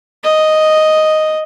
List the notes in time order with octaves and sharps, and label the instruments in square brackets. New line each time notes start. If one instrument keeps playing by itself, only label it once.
[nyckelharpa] D#5